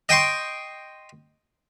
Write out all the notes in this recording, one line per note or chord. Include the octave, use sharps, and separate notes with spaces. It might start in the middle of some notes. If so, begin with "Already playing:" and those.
D#5 G5 C6 C#6